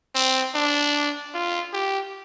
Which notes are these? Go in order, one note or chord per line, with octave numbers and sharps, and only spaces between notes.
C4
D4
F4
G4